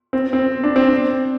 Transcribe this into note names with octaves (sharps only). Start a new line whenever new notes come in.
C4
C4
D4
C4
D4